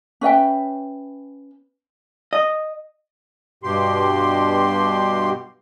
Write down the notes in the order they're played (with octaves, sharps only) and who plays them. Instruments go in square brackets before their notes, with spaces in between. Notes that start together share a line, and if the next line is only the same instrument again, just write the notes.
[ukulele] C#4 B4 E5 G5
[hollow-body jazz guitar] D#5
[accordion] G2 B2 G4 C6